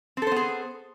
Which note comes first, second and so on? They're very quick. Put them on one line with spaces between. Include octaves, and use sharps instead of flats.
C4 A4 C5 B3 G#4